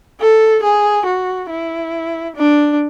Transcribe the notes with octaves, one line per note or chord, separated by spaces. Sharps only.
A4
G#4
F#4
E4
D4